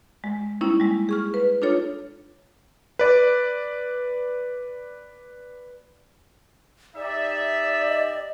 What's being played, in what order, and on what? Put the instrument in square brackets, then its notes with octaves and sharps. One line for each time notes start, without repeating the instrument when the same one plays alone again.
[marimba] G#3
G3 A#3 C#4 D#4 E4
G3 G#3
G#4 C#6 F6
B4
D4 D#4 F4 A4 C#5
[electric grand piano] B4 D5
[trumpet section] D#4 G4 E5 [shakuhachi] D5
[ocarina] D#5